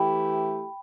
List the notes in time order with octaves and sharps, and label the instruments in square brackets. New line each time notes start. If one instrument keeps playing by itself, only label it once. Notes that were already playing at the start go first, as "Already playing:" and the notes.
Already playing: [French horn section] E3 A3 E4 G4 [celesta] G5 B5